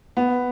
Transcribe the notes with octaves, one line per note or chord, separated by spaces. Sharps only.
B3